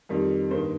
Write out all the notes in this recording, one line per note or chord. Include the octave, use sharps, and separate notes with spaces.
F2 D#3 G3
G2 D#3 A#3 C5